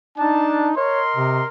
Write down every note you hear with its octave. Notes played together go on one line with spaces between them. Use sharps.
D4 D#4 A5
A#4 C#5 D#5 C6
C3